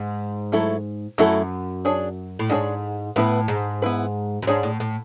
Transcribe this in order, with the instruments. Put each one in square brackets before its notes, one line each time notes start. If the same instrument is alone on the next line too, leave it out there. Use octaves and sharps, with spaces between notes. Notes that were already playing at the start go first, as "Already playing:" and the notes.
Already playing: [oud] G#2
[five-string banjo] F#3 A3 E4 A4
[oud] F#2 [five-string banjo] F#3 A3 E4 A4
[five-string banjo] D4 G#4 C#5
[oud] A2
[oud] G#2 [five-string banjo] D4 G#4 C#5
[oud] A2 [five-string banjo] B3 E4 B4
[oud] G#2
[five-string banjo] B3 E4 B4
[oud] F#2
[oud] G#2 [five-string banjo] D4 G#4 C#5
[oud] A2
A2